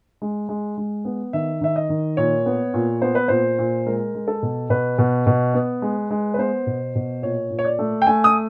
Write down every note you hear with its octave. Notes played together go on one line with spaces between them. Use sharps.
G#3
G#3
G#3
B3
D#3 E5
D#3 E5
D#5
D#3
A#2 C#5
B3
A#2
B3 C5
B4
A#2 C5
A#2
G#3 A#4
G#3
A4
B2
B2 B4
B2
B2
B3
G#3
G#3
B4
B3 C5
B2
B2
A#2 C#5
A#2
C#5
D5
A3
G5
A3 G#5
D#6